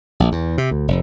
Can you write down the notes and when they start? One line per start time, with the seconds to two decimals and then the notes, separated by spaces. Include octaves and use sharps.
0.20 A#1
0.32 E2
0.58 C3
0.71 D2
0.88 F1